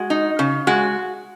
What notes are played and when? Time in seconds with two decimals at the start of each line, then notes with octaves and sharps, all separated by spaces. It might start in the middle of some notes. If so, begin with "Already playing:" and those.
Already playing: G#3 F#4
0.10 D#4
0.39 C#3
0.67 G#3 F#4